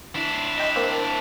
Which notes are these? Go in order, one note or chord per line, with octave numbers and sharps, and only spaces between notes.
D4 E4
C7
D#5 G5 C6
A#3 C4 C5